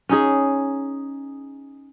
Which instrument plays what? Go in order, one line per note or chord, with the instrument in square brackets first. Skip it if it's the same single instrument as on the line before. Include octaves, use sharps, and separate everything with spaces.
[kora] C#4 D#4 G#4